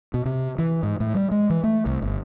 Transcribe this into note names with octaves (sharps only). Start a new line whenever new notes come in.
B2
C3
E3
G#2
A2
G3
G#3
E3
A3
C2
G1